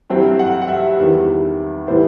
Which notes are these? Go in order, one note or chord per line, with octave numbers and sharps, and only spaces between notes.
G2 F#3 C4 E4
F#5
F#5
E5
E2 D#3 G3 B3 E4
A2 E3 G3 B3 E4 C5